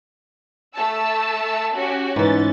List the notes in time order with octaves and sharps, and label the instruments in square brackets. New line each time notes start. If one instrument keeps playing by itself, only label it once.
[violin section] A3 A5 E6
C#4 F#4 G4
[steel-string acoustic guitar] G#2 E3 [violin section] C#4 A6